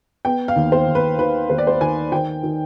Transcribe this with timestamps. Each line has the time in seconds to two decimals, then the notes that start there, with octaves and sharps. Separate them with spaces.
0.25 B3 G5
0.48 F5
0.56 D#2
0.72 C5
0.87 D#2
0.95 B4
1.18 D#3 B4
1.50 D#2 C5
1.58 D5
1.67 C5
1.81 D#3 G#5
2.12 D#3 G5
2.43 D#3